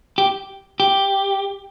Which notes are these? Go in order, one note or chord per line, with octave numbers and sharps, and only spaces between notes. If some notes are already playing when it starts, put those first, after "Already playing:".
G4
G4